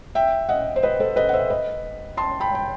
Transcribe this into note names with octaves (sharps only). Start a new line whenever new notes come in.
E5 G5
D#5 F#5
C5
B4 D#5
A4 C5
B4 D#5
F#5
C5 E5
B4 D#5
A5 C6
G5 B5
G5